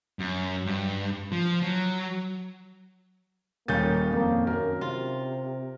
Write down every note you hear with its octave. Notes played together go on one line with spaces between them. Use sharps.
F#2
G2
F3
F#3
D#1 D#3 G3 A#3 C#4 G6 A6
F2 A#3
F#2 A#4
C3 F4